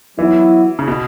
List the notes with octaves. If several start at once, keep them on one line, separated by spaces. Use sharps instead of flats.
E3 F#3 B3 E4
C#3
B2